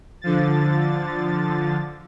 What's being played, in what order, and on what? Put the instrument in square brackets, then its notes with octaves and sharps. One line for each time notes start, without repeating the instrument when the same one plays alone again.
[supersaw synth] D3 F3 A6